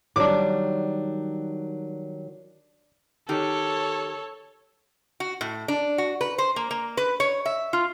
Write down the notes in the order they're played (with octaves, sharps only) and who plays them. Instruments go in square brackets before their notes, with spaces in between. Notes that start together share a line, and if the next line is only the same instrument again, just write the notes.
[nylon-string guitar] D#3 F#3 G3 [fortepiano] D4 D6
[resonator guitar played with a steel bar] D#3 G4 [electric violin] A4 C#5
[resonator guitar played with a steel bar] F#4
A2
D4
F#4
B4
C5
A#3
A#3
B4
C#5
E5
F4